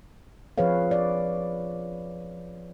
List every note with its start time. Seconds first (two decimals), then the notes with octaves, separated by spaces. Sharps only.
0.58 F3 C4 G#4 B4 C#5 F5
0.91 D5